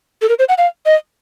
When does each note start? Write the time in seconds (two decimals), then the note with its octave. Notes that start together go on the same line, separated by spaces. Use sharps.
0.22 A4
0.29 A#4
0.39 C5
0.49 F#5
0.58 F5
0.86 D#5